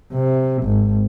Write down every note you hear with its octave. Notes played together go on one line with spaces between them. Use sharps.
C3
G#1